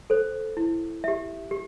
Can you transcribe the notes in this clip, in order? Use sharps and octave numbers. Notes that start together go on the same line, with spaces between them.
A4 C5
E4
G4 E5
G4